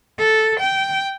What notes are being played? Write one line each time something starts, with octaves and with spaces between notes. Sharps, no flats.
A4
G5